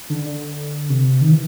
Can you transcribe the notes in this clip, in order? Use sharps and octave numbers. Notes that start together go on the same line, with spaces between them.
D3
D3
C3
D#3
E3